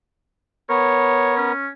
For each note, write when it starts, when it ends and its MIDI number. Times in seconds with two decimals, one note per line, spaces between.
0.69 1.52 59
0.69 1.52 70
0.69 1.36 73
1.37 1.68 61